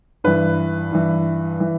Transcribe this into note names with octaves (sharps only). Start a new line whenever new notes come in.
G2 E3 B4
G2 E3
E3